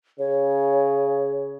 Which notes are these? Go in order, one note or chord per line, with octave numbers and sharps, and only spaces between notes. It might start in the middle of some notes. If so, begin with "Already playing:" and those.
C#3 C#5